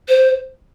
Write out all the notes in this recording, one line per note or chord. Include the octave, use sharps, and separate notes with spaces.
C5